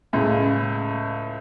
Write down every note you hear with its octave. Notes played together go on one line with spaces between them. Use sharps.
C#2 A2 C#3